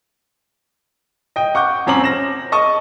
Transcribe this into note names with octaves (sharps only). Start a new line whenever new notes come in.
D#5 G5
F#5 C#6 D6 G6
F2 C4 C#4 A#5 D6 F#7
A#6 E7
D#5 A5 C#6 D#6